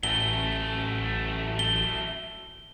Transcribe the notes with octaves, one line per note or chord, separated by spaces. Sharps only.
A1 F#2 A3 G7
G7